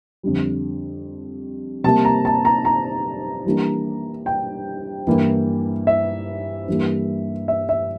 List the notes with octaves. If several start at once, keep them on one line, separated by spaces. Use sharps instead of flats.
F2 D3 G3
C3 G3 A#3 A5
A#5
A5
A#5
A#5
E3 G3 A#3 D4
G5
G2 E3 A#3 E4
E5
G2 E3 G3 A#3
E5
E5